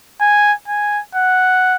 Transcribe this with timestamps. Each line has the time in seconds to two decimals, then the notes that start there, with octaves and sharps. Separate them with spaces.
0.21 G#5
0.68 G#5
1.15 F#5